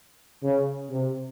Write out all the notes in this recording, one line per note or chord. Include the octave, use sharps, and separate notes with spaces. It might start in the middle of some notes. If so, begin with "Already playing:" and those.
C#3
C3